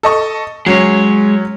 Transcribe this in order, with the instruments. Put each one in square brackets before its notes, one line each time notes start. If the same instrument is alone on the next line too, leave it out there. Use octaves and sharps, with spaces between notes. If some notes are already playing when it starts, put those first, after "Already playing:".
[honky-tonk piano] A4 D#5 C#6
[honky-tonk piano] F#3 C#4 [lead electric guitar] G#3 C#5